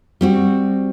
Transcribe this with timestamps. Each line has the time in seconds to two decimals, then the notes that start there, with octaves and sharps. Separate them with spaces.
0.21 G3 C4 F#4